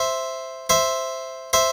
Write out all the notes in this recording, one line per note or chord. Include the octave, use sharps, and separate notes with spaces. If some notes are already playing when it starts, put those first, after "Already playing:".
Already playing: C5 E5
C5 E5
C5 E5